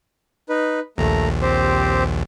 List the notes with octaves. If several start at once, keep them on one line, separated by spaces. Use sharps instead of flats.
D#4 B4
A#1 D#2 A3 A#5
C4 G4 C5